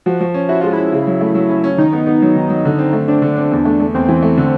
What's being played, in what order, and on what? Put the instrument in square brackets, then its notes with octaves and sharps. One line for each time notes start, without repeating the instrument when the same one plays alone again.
[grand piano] F3 [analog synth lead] F#4
[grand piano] F3
C#4
[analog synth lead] E4 [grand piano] F#4
[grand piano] G#3 [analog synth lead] F4
[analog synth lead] E4
[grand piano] C#4
C#3
F#3
A3
F#3
C#4
C#4
[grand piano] D#3 [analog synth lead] D#4
[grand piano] B3
B3
F#3
D#3
F#3
D3
C4
A3
[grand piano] C4 [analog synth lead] D4
[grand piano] D3
C4
E2
A3
A3
[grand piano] E2 [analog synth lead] C4
[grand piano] E3
A3
D3